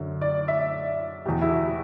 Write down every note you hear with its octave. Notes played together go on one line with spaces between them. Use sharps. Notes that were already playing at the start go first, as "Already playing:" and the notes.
Already playing: F#2 D3
D5
E5
E2 B2 G4
E4
F#4